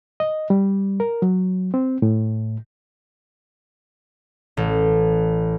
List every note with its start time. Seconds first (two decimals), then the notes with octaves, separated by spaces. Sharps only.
0.20 D#5
0.50 G3
1.00 A#4
1.22 F#3
1.74 C4
2.02 A2
4.57 A1